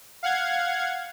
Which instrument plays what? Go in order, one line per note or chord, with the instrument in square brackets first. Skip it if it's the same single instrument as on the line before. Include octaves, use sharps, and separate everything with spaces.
[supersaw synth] F5 F#5 G#6